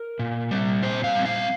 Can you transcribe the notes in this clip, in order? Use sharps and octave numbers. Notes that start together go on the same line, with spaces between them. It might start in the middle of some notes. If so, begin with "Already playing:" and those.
Already playing: A#4
A#2
G3 C4
A#2 C5
F5
G3 C4
F5